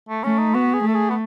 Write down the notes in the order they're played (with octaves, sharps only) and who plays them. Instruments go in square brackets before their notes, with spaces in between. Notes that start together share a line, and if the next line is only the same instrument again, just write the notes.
[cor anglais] A3
[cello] A3 [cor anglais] C#4
[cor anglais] D#4
[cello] B3 [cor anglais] F#4
[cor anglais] G#4
[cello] A3 [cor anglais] A4
[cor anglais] G#4
B3